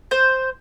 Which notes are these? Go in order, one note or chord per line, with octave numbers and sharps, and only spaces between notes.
C5